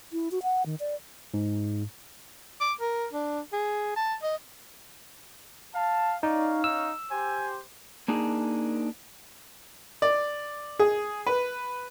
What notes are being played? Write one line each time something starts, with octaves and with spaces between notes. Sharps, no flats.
E4
F#4
F#5
D#3
D5
G#2
D6
A#4
D4
G#4
A5
D#5
F5 A5
C#4 D#4 C#5 D5 F5
D#4 E6
G4 C5 G#5
A#3 D4 D#4 G#4 A#4
D5
G#4
B4